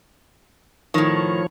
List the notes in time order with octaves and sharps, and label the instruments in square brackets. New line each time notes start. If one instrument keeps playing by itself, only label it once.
[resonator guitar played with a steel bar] A2 D#3 [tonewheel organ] F3 C#5